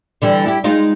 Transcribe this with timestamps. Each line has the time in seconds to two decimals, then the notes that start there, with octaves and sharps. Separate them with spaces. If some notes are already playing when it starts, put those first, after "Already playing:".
0.22 D3 E3 G3
0.46 E4 G4
0.64 G#3 D#4 F4